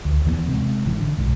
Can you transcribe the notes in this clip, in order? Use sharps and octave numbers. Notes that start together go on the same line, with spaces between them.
D2
D#2 E3 F#3 B3
C3 G#3
G#1 E3
D3
B1 G#2